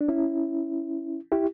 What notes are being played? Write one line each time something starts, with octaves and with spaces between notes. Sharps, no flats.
D4
C#4 E4
E4 G4